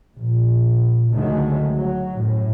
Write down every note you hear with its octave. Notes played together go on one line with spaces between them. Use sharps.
A#1
C#2 D3 D#3 F#3 G#3 A3
F#3
F#2 A2